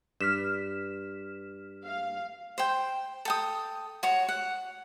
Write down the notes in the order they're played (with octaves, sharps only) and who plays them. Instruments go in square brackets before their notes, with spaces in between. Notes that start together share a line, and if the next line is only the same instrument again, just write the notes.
[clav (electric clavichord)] G2 [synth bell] F6 B6 E7
[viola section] F5
[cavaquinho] C5 G5
A4 G5 D#6
F#4 C#5
F#5